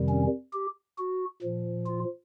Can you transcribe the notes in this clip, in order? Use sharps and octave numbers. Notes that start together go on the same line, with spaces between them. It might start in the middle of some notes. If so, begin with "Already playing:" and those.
Already playing: F2 C3 D#3 G3
C#4
G4
F#4
A#2 F3
F4